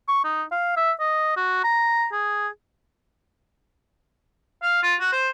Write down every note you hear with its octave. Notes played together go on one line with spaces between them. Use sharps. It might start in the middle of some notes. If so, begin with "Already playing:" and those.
C#6
D#4
F5
E5
D#5
F#4
A#5
G#4
F5
F4
F#4
C5